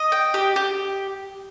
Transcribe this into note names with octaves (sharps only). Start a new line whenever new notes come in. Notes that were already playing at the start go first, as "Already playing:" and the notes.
Already playing: D#5
G5
G4
G4